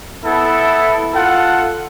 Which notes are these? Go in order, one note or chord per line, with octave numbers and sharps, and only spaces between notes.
B3 E4 A4
F4 A4 F#5